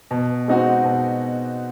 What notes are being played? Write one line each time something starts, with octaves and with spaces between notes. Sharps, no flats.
B2
G#3 C4 D#4 F#4
B2